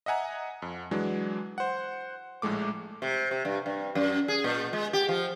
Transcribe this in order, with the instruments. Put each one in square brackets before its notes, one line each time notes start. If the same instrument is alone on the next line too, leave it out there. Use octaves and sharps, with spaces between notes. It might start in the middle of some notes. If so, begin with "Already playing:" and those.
[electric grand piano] D#5 E5 F#5 G#5 A#5
F2
E3 F#3 G#3 D4
C5 F#5
A#1 A2 G#3 A3 D6
[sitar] C3
C3
G2
G2
F#2
G#4
A#2
G#3
G4
F3